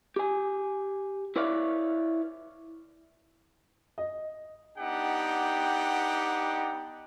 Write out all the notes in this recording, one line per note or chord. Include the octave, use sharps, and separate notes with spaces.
G4 G#5
E4 B4 C#5 D5 E5 F5
D#5
B3 D4 D#4 G4 F#5 G5